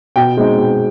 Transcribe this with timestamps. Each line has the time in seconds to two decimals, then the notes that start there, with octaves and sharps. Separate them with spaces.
0.16 B2 G5
0.37 G#3 C4 D#4
0.58 B2